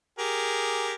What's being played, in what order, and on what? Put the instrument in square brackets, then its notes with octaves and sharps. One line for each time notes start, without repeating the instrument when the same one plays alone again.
[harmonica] G4 G#4 A#4